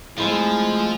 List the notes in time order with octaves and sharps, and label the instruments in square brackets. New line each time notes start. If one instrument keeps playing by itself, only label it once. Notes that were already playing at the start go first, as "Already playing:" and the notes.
[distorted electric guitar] F3 [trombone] G#3 [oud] A3 C4 F4 [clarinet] E4